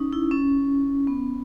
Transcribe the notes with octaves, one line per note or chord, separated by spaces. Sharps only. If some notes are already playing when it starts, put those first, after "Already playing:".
Already playing: C#4 D#4
E4
C#4
B3